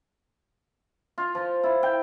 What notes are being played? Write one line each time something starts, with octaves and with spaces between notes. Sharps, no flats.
F4
F3
E4
G5